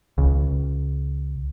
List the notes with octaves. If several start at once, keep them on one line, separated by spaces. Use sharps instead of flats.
C#2